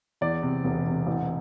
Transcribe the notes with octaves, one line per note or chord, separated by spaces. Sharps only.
E2 D5
C3
E1
C3
A1